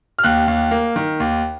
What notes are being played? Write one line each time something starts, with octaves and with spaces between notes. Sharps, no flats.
F6
D#2 F#6
D#2
A#3
D#3
D#2